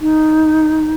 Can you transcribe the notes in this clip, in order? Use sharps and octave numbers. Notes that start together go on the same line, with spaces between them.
D#4